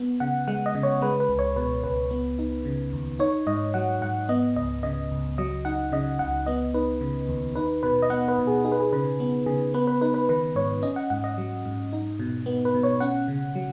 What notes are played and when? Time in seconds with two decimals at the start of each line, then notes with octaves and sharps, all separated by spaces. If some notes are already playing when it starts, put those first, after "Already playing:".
Already playing: B3
0.20 C#3 F#5
0.48 G#3 F#5
0.66 D#5
0.75 C#3
0.83 C#5
1.02 G#3 B4
1.20 B4
1.29 C#2
1.39 C#5
1.56 B2 B4
1.83 C#2 B4
2.11 B3
2.39 D#4
2.65 C#3
2.93 D#2
3.19 D#4 C#5
3.47 G#2 D#5
3.74 F#3 F#5
4.01 G#2 F#5
4.29 B3 D#5
4.56 C#2 D#5
4.83 C#3 D#5
5.11 C#2
5.38 F#3 D#5
5.65 D#4 F#5
5.92 C#3 D#5
6.19 C#2 F#5
6.46 B3 D#5
6.74 D#4 B4
7.01 C#3
7.28 D#2
7.55 D#4 B4
7.83 B2 B4
8.02 D#5
8.10 B3 F#5
8.28 B4
8.38 B2
8.47 G#4
8.64 D#4 G#4
8.72 B4
8.80 G#4
8.93 C#3 B4
9.20 B3
9.46 C#3 G#4
9.74 B3 B4
9.87 B4
10.01 D#4 B4
10.14 B4
10.29 D#3 B4
10.56 G#2 C#5
10.82 C#4 D#5
10.96 F#5
11.10 G#2 F#5
11.24 D#5
11.38 F#3
11.65 G#2
11.93 D#4
12.19 B2
12.46 B3
12.65 B4
12.74 B2
12.83 C#5
13.00 C#4 F#5
13.28 C#3
13.55 F#3